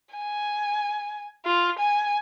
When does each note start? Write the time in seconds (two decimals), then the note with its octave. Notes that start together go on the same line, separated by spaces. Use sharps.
0.15 G#5
1.46 F4
1.79 G#5